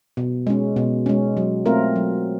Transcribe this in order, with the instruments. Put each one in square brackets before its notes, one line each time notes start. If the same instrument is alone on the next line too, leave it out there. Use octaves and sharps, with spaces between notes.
[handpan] B2
G#3 C#4
B2
G#3 C#4
F#3
A3 C4 F4 A#4
F#3